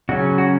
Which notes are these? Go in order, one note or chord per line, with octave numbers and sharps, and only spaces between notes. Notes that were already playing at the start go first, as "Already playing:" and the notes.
C#3 F#3 C#4 F#4
F#4